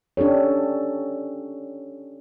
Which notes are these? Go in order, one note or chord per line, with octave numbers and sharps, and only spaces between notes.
C#4 D4 G4 A4 C#5